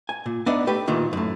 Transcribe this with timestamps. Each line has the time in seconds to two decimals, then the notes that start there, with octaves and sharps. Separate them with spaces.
0.09 G#5
0.26 A#2
0.46 B3 D4 D#4 B4 D5 E5
0.67 A3 G4 B4
0.87 D2 A#2 D#3 E3
1.13 F#2 A2